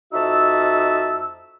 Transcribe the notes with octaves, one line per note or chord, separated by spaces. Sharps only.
F2 D#4 F#4 E5 A5 E6